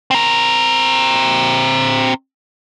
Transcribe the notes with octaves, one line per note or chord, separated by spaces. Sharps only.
C4 A#4